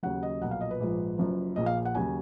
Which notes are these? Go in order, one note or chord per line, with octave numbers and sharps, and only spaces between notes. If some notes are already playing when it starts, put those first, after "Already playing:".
D#2 C#3 F#3 F#5
D#5
B1 A#2 F3 F#5
F5
D#5
B4
A#1 G#2 F3
F#1 F#2 F3
A#1 A#2 F3 D#5
F5
F#5
D#2 C#3 F#3 G#5